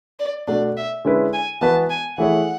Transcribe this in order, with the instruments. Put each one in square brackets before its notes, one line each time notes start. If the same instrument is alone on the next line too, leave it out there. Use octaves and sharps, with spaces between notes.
[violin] D5
[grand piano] B2 A3 D4 [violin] D5
[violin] E5
[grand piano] D3 G#3 C#4 E4 B4
[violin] G#5
[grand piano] E3 B3 F#4 B4 [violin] A5
[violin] G#5
[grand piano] E3 A3 E4 G#4 C#5 [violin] F#5